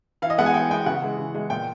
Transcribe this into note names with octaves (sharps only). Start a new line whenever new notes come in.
E3 F5
D#5
G#3 B3 F#5
G#5
E3 G5
G#3 B3 G5
C#3 F#5
E3 G#3
C#3
E3 G#3
A#2 G5